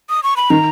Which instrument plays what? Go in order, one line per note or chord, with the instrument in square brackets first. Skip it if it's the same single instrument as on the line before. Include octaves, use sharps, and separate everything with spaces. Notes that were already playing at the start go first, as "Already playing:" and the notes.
[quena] D#6
C#6
B5
[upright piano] D#3 [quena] A#5